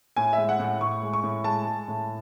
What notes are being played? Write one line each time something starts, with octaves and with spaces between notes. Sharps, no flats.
A2 G#5
G#3 E5
F#5
A2
F#5
A2 C#6
G#3
C#6
A2
G#3 A5
G#3
A2